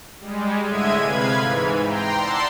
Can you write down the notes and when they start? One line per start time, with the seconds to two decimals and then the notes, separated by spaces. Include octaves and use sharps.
0.20 G3 G#3
0.66 A2 D3 G#3 E5 G#6 D#7
1.03 C3 B4 F5 B5 G#6
1.37 G#2 E3
1.84 G5 A#5 C6
2.17 D5 F#5 A5 C6 E6